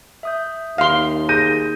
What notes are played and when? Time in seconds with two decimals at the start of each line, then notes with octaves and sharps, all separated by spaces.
0.23 E5 D#6 G6
0.78 D#2 F5 C6
1.29 G#4 G6 A#6 D#7